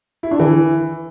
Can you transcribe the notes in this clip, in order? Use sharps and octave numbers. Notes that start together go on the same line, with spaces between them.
E4
D4
E3